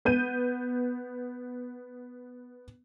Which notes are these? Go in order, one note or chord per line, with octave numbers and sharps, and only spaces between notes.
B3 G6 D#7